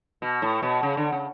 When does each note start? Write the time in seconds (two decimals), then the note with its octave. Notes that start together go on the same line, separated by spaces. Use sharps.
0.22 B2
0.42 A2
0.63 B2
0.83 C#3
0.97 D3
1.12 C#3